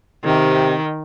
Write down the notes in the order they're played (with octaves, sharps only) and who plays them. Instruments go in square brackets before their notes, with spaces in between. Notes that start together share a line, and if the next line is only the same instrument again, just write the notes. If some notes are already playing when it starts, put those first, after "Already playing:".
[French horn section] C3 [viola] D#3